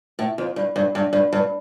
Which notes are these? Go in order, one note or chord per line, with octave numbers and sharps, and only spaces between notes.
A2
F2
G2
G2
G2
G2
G2